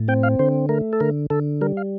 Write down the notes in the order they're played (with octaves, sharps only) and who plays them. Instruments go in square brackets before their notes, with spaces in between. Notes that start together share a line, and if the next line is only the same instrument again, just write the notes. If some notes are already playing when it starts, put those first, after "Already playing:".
Already playing: [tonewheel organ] A2
C4 G5
F5
D3 C5
A3 A#4
A4
D3 A#4
D3 A4
G3 A#4
F5